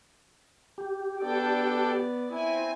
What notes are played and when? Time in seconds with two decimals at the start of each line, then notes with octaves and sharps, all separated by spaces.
0.78 G4
1.21 B3 D4 A4 D5 G5
2.31 C4 E4 G#5